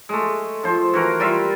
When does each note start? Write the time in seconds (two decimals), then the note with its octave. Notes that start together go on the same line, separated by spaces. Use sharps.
0.09 G#3 A3
0.64 F3 C5
0.94 E3 F#4 A#4
1.20 G3 F4 E5